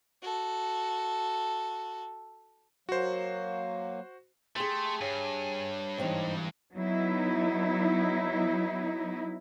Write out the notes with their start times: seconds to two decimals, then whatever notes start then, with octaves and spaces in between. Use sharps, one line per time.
0.22 F#4 A4
2.89 F#3 A#3 F#4 C5
4.56 A3 G4 G#4 C6
5.01 G2 C#5 G#5
5.98 G#2 E3 G3 C4 D#4
6.74 F#3 B3 D#4 E4